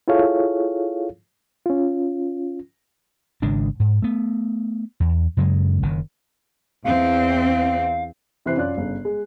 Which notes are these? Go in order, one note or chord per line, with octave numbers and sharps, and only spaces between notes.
E4 F4 G#4 A4 C#5 F5
C#4 F4
G#1 C#3 G#3 D4
G#2
A3 B3
E2
F#2 C#3 F#3 G#3
F#1 D#3
E2 C4 F5
C3 E3 E4 C5 F#6 C7
F#2 F4 D5 F#6
G1 C#3
G#3